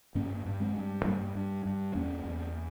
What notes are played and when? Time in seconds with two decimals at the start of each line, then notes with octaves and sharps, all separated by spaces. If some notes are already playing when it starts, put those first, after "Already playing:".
0.15 G2 A#3 C#4
0.46 G2
0.60 G#3 C4
0.75 G2
1.05 G2 G3 A#3
1.35 G2
1.65 G2
1.95 E2 A#3 C#4
2.25 E2